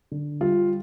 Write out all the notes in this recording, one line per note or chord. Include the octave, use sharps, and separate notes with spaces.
D3
G3 F4